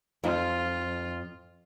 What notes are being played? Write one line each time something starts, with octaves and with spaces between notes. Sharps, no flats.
F2 F4